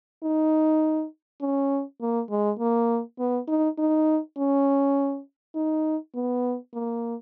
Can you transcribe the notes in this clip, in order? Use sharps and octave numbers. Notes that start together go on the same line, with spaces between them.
D#4
C#4
A#3
G#3
A#3
B3
D#4
D#4
C#4
D#4
B3
A#3